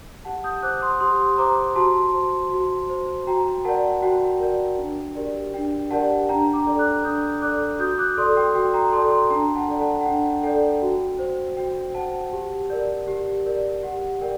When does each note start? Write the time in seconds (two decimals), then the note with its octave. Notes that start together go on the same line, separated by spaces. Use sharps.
0.25 G4 F#5 A5
0.44 D#6 G6
0.63 C5 D6 F#6
0.82 C6 D#6
1.00 G4 C6 D#6
1.38 C5 A#5 D6
1.76 F#4 A5 C6
2.14 C5
2.51 F#4
2.89 C5
3.27 F#4 G5 A#5
3.65 A#4 D5 F#5 A5
4.02 F#4 G5
4.40 A#4 D5
4.78 D4
5.15 G4 A#4 D5
5.53 D4 G5
5.90 G4 A#4 D5 F#5 A5
6.29 D4 G5 A#5
6.53 A#5 D6
6.66 A4 D5
6.79 D6 F#6
7.04 D4 D#6 G6
7.42 A4 D5 D6 F#6
7.79 F#4 D#6 G6
7.98 D6 F#6
8.17 A4 D5 C6 D#6
8.37 G5
8.55 F#4 G5
8.74 G5 A#5
8.92 A4 D5 A5 C6
9.12 A5 C6
9.30 D4 G5 A#5
9.56 F#5 A5
9.68 A4 D5
9.81 F#5 A5
10.01 F#5
10.06 D4 G5
10.43 A4 D5 G5
10.82 F#4
11.19 C5
11.57 F#4 G5
11.95 C5 F#5 A5
12.33 G4
12.70 A#4 D5
13.08 G4
13.46 A#4 D5
13.83 G4 F#5
14.21 A#4 D5 G5